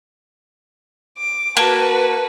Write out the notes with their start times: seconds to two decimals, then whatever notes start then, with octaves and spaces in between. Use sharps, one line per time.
1.18 D6
1.57 A#3 F#4 B4 A5